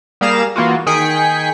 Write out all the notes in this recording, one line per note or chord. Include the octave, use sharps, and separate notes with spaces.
G3 A#3 G#4 F5 A#5 E7
E3 A#3 F4 F#4
D#3 G#4 G5 B6 C#7